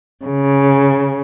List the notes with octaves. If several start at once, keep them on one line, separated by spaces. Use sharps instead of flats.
C#3